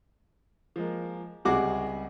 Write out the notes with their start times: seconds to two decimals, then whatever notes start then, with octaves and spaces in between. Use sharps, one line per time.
0.76 F3 G#3 A#3
1.45 C#2 C3 G3 F#4 G#4 D6